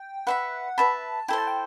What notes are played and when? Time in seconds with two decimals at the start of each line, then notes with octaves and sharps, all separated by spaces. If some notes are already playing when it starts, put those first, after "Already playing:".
Already playing: G5
0.27 B4 E5 F#5 B5
0.78 B4 E5 A5 B5
1.28 E4 A4 C5 G5
1.38 A5
1.47 G5